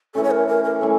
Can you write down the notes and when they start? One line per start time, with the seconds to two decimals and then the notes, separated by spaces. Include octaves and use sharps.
0.15 E3 A3 C#4 A4
0.24 C#5
0.31 A#4
0.48 A#4
0.64 A#4
0.80 E3 A3 C#4 A4